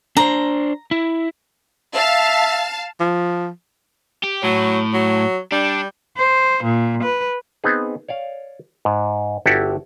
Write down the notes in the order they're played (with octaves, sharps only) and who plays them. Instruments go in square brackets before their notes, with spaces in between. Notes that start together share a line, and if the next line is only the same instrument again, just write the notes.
[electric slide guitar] D4 C5 [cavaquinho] A#5
[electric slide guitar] E4
[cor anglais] E5 [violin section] F5 A5
[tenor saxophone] F3
[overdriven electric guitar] G4
[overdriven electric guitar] A2 [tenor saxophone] F#3
[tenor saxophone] F#3
[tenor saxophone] G3 [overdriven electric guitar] D4
[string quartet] C5
A#2
B4
[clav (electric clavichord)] B3 C4 D#4 G#4
C#5 D5 F5
G#2
G1 E4 F#4 G4 A4 F#5